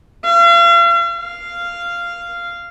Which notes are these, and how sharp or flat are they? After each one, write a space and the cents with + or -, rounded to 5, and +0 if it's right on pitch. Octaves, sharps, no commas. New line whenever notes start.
F5 -40
F5 -10